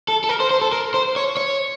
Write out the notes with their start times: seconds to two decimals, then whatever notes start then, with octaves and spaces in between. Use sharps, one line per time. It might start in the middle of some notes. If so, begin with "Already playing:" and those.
0.08 A4
0.24 A4
0.29 A#4
0.40 C5
0.51 C5
0.61 A4
0.72 A#4
0.94 C5
1.16 C#5
1.37 C#5